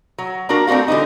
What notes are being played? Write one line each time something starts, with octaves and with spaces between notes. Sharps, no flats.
F#3
A#3 D4 F#4 A#4
A3 C4 D4 F#4 F5
D3 E3 G3 D#4